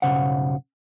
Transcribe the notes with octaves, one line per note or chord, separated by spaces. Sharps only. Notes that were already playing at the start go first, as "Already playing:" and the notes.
B1 G2 C#3 C5 F#5